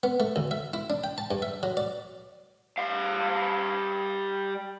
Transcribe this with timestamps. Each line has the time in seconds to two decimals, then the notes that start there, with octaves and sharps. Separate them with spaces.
0.03 B3
0.20 A3
0.36 D2
0.51 E5
0.74 E4
0.90 D4
1.04 G5
1.18 A5
1.31 G2
1.42 E5
1.63 F#3
1.77 D5
2.78 G3 F5